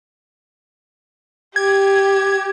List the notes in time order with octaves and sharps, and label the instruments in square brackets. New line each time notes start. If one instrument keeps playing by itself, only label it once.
[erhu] G4 [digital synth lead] G#6